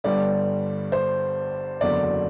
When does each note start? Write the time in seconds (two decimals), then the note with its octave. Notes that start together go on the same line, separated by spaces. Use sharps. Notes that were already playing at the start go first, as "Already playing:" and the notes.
0.04 G1 G2 D3 G3 D5
0.92 C5
1.81 F#1 E2 D3 F#3 D5